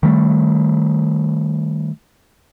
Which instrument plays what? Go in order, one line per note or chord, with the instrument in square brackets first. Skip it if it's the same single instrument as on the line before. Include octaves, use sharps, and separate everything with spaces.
[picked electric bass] D#3 G3 A3